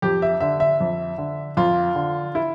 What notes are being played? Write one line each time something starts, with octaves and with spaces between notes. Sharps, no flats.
F2 G4
E5
D3 E5
E5
F2
D3
F2 F4
D3
E4